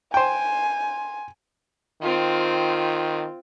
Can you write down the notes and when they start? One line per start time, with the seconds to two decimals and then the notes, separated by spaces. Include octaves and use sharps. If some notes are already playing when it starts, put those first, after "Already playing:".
0.14 C5 G5 G#5
2.02 D#3 C4 F4